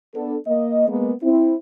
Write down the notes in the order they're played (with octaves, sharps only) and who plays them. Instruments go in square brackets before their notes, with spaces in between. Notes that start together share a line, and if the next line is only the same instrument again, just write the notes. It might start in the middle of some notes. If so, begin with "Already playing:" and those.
[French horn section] B3 D4 A4
A#3 D#5
G#3 A#3 B3
C4 E4